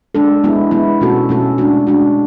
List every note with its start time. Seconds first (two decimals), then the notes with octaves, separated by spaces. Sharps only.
0.15 G#3 D4 A4
0.44 G#3 B3 E4
0.71 G#3 B3 E4
1.01 B2 A3 C#4 F#4 A4
1.29 B2 A3 C#4 F#4 A4
1.58 G#3 D4 F#4
1.87 G#3 D4 F#4